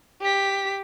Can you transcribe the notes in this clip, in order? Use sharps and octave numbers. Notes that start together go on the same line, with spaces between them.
G4 B6